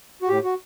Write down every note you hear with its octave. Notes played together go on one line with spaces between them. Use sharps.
F#4
A2 G4
F#4